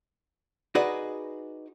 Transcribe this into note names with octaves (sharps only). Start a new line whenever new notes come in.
D#4 F#4 G#4 B4 D5 D#5